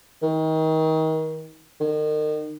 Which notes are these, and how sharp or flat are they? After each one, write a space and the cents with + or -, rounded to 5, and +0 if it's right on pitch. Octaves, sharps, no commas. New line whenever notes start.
D#3 +30
D#3 -35